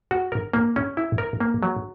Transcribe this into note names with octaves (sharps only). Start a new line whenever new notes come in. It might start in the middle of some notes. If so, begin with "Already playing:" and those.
F#4
A#4
A#3
C#4
E4
A#4
A#3
F#3